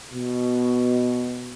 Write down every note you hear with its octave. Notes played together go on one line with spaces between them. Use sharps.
B2